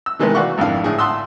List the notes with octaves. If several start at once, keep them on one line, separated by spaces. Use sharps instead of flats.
E6
C3 D#3 E3 G#3 A3 B3
F#4 B4 D5 F5 F#5 C#6
G#1 F2 D3 E4 F5
A2 D3 G#4
E5 F#5 A5 C6 D#6 E6